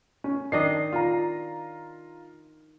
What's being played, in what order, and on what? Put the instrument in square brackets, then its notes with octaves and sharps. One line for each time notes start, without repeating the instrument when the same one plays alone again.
[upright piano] C#4
[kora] D#3 D4 D#5 [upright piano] C7
[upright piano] F4 A#5